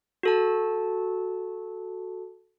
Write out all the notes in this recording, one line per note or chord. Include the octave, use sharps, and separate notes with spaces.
F#4 A4 A5